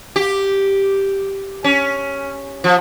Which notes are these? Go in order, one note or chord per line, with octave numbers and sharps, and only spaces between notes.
G4
C#4
F3